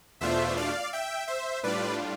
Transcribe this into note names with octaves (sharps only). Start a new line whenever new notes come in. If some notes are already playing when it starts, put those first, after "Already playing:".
E2 B2 A3 D4 F4 C5 E5
D5 F5
E5 G5
C5 E5
A2 G3 D4 F4 B4 D5